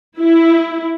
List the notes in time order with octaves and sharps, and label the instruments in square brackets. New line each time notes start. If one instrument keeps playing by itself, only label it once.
[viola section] E4